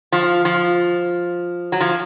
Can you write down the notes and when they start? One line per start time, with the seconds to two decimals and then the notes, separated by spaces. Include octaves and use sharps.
0.12 F3
0.45 F3
1.72 F#3
1.81 F3